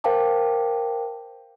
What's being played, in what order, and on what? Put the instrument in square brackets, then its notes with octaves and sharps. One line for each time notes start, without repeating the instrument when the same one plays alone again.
[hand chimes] A#4 C5 F5 G5 A5 D6